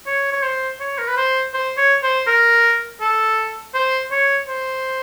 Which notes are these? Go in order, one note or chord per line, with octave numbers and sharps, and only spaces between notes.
C#5
C#5
C5
C#5
A#4
B4
C5
C5
C#5
C5
A#4
A4
C5
C#5
C5